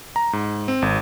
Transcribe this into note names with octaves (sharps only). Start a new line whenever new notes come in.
A#5
G#2
C4
G#1